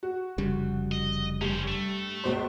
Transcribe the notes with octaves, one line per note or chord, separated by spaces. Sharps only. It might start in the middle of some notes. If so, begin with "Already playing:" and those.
F#4
F1 C#3 G3
D#5
G2 C#4 C5
A3
C#2 B2 C5